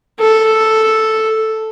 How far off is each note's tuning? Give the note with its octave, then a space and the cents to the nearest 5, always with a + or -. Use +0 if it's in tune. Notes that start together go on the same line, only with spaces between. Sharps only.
A4 +0